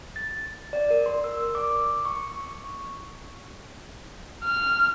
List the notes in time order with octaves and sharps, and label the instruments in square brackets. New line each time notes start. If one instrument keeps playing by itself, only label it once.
[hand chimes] A6
D5
A#4
C6
E6
D6
C#6
[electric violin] F6